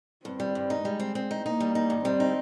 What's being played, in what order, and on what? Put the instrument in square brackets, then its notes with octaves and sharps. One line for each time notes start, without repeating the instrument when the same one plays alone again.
[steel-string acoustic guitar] G2 [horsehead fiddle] C4
[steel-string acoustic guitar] G3
G2
D#4
[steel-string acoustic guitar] G3 [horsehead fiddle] G#3
[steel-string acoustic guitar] C4
C4
D#4
[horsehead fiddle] A#3 [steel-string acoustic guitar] D#4
[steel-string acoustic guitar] G3
D#4
G2
[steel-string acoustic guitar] G3 [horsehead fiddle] C4
[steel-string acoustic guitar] D#4